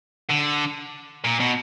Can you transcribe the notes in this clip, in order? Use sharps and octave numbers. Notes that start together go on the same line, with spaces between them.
D3
A#2
B2